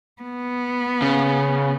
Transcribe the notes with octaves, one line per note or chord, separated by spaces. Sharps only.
B3
C#3